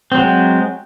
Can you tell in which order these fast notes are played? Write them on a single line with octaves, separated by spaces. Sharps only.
C4 F#3 G#3